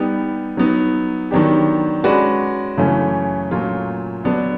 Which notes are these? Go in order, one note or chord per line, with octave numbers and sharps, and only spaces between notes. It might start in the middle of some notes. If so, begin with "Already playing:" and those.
Already playing: G3 B3 D#4 G4
F#3 B3 D#4
D#3 F#3 B3 D4 G4
G#3 C#4 F#4 B4 D5
F#2 C#3 E3 A3 C#4
A#2 F#3 A3 C#4 F4
D3 F#3 B3 D4